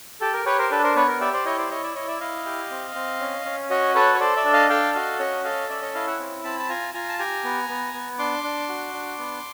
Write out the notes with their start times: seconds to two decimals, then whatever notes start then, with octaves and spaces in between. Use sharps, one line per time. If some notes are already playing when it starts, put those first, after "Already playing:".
0.21 G4 A4
0.33 A#4
0.46 G4 B4 C#5
0.58 A#4 C5
0.71 D4 A4 B4
0.83 A#4 C5
0.95 B3 B4 C#5
1.08 A#4
1.21 G4 D5 E5
1.33 C5 D5
1.45 E4 C#5 D#5
1.58 C5 D5
1.70 E4 C#5 D#5
1.83 D5 E5
1.95 E4 C#5 D#5
2.08 D5 E5
2.20 E4 D#5 F5
2.45 G4
2.71 C4
2.95 C4
3.20 C#4
3.45 C#4
3.70 F#4 C#5 D#5
3.95 A4 B4 C#5
4.15 C#5
4.20 A4 C5 D5
4.37 D5 E5
4.45 D4
4.53 D#5 F5
4.69 A4 F5 G5
4.95 F#4 D#5 F5
5.19 C#4 C#5 D#5
5.44 A4 D#5 F5
5.69 C#4 D5 E5
5.82 C#5 D#5
5.94 E4 D#5 F5
6.07 E5 F#5
6.19 C4
6.44 C4 A5 B5
6.59 A5
6.69 F4 G#5 A#5
6.94 F4 G#5 A#5
7.09 A5
7.19 G4 G#5 A#5
7.44 B3
7.69 B3
7.94 B3
8.19 D4 C6 D6
8.44 D4
8.69 F#4
8.94 D4
9.19 B3